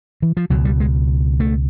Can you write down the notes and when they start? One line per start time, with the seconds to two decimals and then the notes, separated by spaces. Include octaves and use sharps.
0.22 E3
0.37 F3
0.50 C#2 B2 F#3
0.65 G3
0.80 G#3
1.40 A3